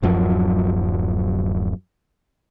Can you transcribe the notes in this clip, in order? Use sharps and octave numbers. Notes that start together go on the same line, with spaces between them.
D1 F#2 F3 F#3